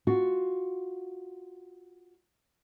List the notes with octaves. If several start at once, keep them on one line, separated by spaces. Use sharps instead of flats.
F4 F#4